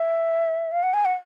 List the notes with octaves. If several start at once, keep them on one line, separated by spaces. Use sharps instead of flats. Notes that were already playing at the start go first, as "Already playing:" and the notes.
Already playing: E5
F5
F#5
G#5
F#5